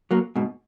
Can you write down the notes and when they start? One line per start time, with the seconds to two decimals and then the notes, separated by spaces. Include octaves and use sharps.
0.11 F#3 A#3
0.36 G#2 B2